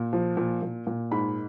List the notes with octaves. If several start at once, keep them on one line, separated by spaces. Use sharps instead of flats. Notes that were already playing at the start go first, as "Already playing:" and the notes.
Already playing: A#2
F3
A#2
A#2
A#2
G#2 B5